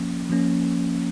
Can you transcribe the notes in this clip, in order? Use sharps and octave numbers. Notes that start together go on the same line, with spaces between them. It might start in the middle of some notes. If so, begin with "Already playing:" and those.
Already playing: F3 A#3 C#4
F3 A#3 C#4